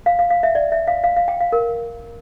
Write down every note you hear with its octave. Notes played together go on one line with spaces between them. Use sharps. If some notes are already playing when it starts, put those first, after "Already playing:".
F5
F5
F5
E5
D5
E5
F5
F5
F5
G5
F5
A#4